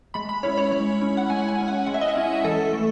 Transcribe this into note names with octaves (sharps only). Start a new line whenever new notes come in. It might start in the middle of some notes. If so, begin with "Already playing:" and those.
G#3 B5
B5
C#4 E4 C#5
C#5
G#3 C#5
C#4 E4
F#5
G#3 G#5
G#5
C#4 E4
F#5
G#3 F#5
E5
D#5
E5
C#4 E4
E3 A4
A3